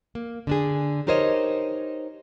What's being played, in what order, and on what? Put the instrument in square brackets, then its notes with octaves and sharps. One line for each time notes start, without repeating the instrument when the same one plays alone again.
[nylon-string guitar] A#3
D3 D4 G#4
D#4 G4 A#4 C5 C#5 D#5